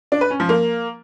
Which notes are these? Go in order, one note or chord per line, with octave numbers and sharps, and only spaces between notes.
D4
B4
C#4
F3
A#3